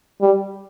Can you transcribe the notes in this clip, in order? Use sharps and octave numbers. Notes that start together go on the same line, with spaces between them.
G3